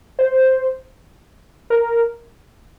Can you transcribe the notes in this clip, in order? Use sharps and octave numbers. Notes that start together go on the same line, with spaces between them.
C5
A#4